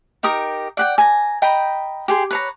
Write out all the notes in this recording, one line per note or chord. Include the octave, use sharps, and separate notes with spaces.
D#4 G4 A#4 D#6
D5 F#5 G5
G#5 A#5
D#5 G5 A#5 B5
G4 G#4 C6
B4 C#5 A#5